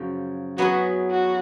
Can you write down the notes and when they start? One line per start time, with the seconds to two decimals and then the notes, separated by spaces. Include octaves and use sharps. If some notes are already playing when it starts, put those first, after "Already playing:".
Already playing: F#2 C#3 F3
0.58 F#3 B3 E4 F#4 G#4 B4
1.11 F#4